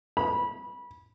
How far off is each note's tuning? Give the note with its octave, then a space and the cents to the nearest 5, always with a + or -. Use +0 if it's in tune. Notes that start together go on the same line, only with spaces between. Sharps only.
B5 -20